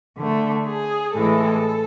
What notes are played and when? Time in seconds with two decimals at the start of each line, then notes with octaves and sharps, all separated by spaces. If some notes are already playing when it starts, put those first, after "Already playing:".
0.17 D3 A3
0.65 G#4
1.14 A2 E3 G#3 A4